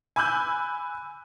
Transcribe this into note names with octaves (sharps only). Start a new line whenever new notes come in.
G#5 B5 D6 E6 F#6 G6